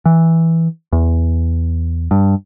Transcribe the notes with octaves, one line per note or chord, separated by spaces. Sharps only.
E3
E2
G2